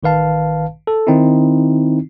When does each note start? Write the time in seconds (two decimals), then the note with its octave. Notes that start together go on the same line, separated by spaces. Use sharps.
0.03 A1 D#3 B4 F5 A5
0.87 A4
1.07 D#3 C4 D#4 E4